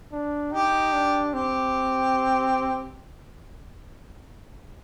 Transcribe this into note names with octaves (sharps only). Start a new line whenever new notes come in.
D4
D#4 G4
D4
C4 G4